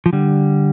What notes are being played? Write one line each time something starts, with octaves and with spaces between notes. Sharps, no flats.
F3
D3 G3